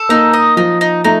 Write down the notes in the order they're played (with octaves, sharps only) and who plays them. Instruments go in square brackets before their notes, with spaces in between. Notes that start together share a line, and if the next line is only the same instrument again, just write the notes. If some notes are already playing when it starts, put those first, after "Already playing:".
Already playing: [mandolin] A4
[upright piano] A#3 [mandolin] D#4
[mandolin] D#5
[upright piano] F3 [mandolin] D#4
[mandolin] D#4
[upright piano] A3 [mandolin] D#4